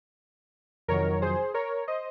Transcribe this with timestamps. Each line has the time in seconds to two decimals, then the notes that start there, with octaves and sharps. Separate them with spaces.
0.88 F2 C3 D#3 F#3 A#4 C#5
1.22 G#4 C5
1.54 A#4 C#5
1.88 C5 D#5